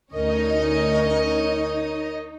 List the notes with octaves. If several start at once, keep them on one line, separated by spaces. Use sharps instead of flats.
D2 C#4 D#4 A#4 C#5 D#5